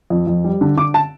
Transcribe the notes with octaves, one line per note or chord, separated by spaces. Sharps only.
F2
F2
G3
D3
D3 D6
A5